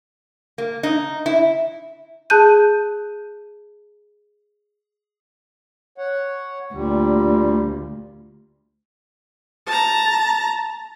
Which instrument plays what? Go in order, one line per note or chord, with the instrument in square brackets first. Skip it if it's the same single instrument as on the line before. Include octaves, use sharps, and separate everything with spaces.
[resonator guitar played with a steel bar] A#3
D#4
E4
[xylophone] G#4 A5 F#6 G6 D#7
[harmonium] C#5 F#5
[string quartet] D2 [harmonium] A#2 G3
[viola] A5 A#5